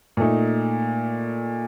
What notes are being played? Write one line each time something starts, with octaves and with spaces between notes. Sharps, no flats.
A#2 A3 D#4